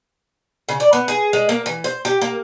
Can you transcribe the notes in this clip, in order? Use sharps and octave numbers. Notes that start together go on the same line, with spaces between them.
C#3
D5
B3
G#4
G#3
A#3
E3
C5
G4
A#3